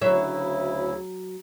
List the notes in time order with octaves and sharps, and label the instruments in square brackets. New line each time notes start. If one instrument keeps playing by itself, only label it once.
[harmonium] D2 C#3 E4 [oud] F#3 C#5 E5